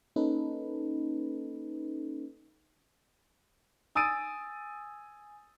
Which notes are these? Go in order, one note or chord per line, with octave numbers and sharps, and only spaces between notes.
A#3 C#4 D#4 A4 B4
G#5 D#6 E6 A6 D7 D#7